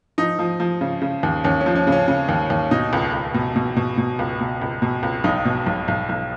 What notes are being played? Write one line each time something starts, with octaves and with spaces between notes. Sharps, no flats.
F3 D#4
F3
F3
C#3
C#3
D#2
D#2 C#4
C#4
F3
C#4
C#3
C#4
C#3
D#2
D#2
B2 D#4
C#2
C#2
B2
B2
B2
B2
C#2
B2
C#2
B2
C#2
B1 D#4
B2
B1
B1
B1